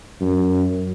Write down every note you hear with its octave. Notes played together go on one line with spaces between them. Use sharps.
F#2